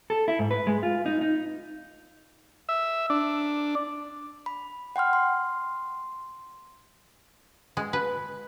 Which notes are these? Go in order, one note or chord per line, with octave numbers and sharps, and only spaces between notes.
A4
E4
G#2
B4
G#3
F4
D#4
D#4
E5
D4
B5
F#5 G5 C6 F6
C6
G#3
B4